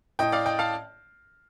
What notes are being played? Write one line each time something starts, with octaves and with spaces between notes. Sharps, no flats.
A2 D#5 G5
D5 F5
D#5 G5
F5 A5